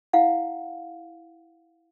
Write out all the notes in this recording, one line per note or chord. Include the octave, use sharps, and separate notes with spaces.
E4 F5 F#5